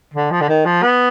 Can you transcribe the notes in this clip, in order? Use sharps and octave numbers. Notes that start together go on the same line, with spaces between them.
D3
F3
D3
D#3
F3
B3